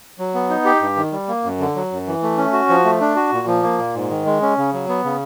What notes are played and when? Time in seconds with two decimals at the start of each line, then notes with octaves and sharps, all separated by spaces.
0.19 F#3
0.35 B3
0.50 D#4
0.65 G4
0.81 G2
0.96 D#3
1.12 G3
1.28 A#3
1.44 F#2
1.60 D3
1.76 F#3
1.91 F#2
2.07 E3
2.23 A3
2.38 C#4
2.53 F#4
2.69 F3
2.85 A3
3.01 D4
3.16 F#4
3.32 A#2
3.47 F3
3.63 A#3
3.78 A#2
3.95 G#2
4.10 D#3
4.25 G#3
4.42 C#4
4.58 C#3
4.73 F#3
4.89 B3
5.04 C#3